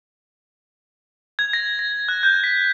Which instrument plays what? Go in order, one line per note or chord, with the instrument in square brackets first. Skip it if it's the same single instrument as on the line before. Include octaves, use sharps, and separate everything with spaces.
[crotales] G#6
A#6
A#6
F#6
G6
B6